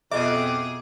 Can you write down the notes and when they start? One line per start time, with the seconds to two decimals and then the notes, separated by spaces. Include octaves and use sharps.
0.12 F2 B2 G#4 D#5 E5 D6